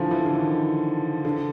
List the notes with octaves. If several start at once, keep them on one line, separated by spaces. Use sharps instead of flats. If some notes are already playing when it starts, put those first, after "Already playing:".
Already playing: D3 E3 F3
E3
D3
D#3
D3